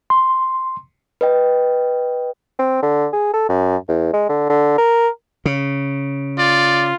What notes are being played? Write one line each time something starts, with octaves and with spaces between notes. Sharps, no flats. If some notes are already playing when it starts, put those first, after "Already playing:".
C6
B4 D#5 G5
C4
D3
G#4
A4
F#2
E2
G#3
D3
D3
A#4
C#3
F4 D5